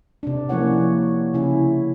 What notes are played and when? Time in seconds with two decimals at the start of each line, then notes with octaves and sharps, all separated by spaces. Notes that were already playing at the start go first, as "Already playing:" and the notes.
0.23 C3 D4
0.49 F3 A#3 C#4 E4 C#5 F#5
1.34 C#3 C#4 E4